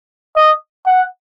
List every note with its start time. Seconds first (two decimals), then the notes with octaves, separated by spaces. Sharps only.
0.36 D#5
0.87 F#5